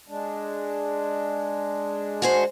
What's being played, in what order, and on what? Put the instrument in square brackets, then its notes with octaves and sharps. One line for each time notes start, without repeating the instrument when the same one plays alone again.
[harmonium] G#3 D4
[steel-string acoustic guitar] F#4 G#4 C5